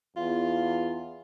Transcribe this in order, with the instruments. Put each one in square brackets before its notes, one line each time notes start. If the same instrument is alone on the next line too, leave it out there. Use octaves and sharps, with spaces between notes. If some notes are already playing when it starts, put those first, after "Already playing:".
[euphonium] E2 [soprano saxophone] F4